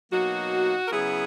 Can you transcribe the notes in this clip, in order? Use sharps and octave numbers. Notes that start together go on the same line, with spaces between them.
B2 F#3 A#3 D#4 F#4
A#4
C#3 F#3 B3 E4 G#4